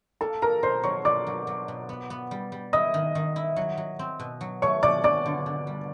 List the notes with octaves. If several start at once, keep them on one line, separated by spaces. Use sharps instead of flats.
A#3 A4 A5
A#3 A#4 A#5
B2 C5 C6
F#3 C#5 C#6
B2 D5 D6
F#3
F#3
B2
B3
B3
G3
G3
E4 D#5 D#6
D#3
D#3
E4
F#3
F#3
C4
B2
F#3
A3 C#5 C#6
B2 D5 D6
B2 D5 D6
D3
D3
G3